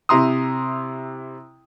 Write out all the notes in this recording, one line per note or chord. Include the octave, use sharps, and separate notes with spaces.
C3 E4 A#5 C6 D#6